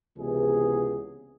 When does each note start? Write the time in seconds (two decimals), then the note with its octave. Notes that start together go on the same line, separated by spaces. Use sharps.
0.17 C#2 C3 E3 B3 G#4